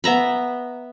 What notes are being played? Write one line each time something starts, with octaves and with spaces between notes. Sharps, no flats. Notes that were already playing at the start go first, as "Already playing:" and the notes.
B3 E5 A#5 B5